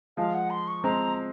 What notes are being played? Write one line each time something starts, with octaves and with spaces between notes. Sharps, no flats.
F3 G#3 F5
F#5
C6
C#6
G#3 C4 A#5